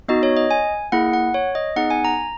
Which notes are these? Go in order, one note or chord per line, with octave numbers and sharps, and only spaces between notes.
B3 D#4 F#4 D#5
C#5
D#5
G#5
A#3 E4 G#4 F#5
F#5
C#5
D#5
B3 D#4 G#4 F#5
G#5
A#5